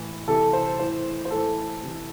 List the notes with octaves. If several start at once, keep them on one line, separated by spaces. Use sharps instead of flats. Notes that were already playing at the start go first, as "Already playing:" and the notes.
Already playing: A2 E3
C3 E3 A4
C5
A2 E3 C5
C5
A2 E3 A4
C3 E3